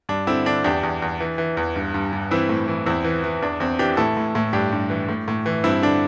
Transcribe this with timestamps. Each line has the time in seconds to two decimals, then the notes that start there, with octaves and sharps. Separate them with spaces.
0.09 G2 D4
0.27 D3 C4 E4
0.46 D3 D4
0.64 E2 D4 G4
0.83 E2
1.02 E2
1.20 E3
1.38 E3
1.57 E2
1.76 G2
1.94 G2
2.13 G2
2.31 E3 C4 E4
2.49 A2
2.68 E3
2.86 E2 C4 E4
3.04 E3
3.24 E3
3.42 E2 D4
3.60 E2 C4
3.79 E3 D4 G4
3.97 A2 E4 A4
4.17 A2
4.35 A2
4.53 G2 D4 G4
4.72 G2
4.90 E3
5.09 A2
5.28 A2
5.46 E3
5.64 G2 C4 E4
5.82 D3 D4